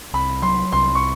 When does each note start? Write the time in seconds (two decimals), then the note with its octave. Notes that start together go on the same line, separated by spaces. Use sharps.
0.13 C2 B5
0.42 F#3 C6
0.72 C2 C6
0.95 C#6